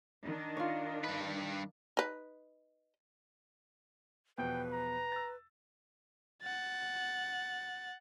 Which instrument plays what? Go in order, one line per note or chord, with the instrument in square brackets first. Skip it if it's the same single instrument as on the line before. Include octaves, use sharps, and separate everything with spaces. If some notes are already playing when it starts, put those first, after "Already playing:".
[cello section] D#3 D4
[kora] F4 C#5
[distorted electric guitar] G2 B4
[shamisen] D#4 B4
[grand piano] E2 B2 F3 [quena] B4 [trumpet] G5
[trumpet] A#5
[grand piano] E6 A6
[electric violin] F#5 A6